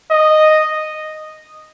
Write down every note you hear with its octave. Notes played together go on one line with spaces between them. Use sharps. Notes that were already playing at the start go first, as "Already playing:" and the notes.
D#5